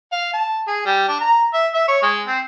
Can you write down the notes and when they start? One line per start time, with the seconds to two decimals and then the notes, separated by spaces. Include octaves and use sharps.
0.12 F5
0.33 A5
0.67 G#4
0.85 G3
1.08 D4
1.20 A#5
1.53 E5
1.74 E5
1.88 C#5
2.02 G#3
2.27 C4